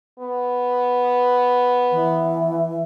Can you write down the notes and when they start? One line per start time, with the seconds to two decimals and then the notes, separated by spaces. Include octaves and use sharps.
0.19 B3
1.92 E3